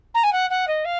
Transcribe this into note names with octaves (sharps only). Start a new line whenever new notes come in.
A#5
G#5
F#5
F#5
D#5
F5